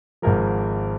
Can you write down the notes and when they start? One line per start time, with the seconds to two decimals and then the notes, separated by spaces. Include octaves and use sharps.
0.22 G#1 G#2 F3 A#4